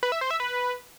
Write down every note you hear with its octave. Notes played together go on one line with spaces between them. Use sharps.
B4
E5
C5
E5
B4